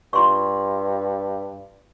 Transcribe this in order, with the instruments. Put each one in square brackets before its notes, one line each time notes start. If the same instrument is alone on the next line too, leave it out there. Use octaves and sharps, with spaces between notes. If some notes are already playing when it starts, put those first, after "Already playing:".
[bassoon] G2 [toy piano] F4 C6 C#6